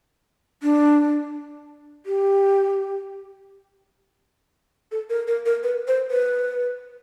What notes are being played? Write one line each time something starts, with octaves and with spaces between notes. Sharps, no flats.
D4
G4
A4
A#4
A#4
A#4
B4
C5
B4